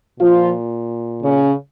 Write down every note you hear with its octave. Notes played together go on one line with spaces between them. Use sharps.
A#2 F3 F4
C#3 C#4